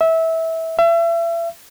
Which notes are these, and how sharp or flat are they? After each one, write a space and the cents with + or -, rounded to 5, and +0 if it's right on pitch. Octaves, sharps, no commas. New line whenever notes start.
E5 -20
E5 +35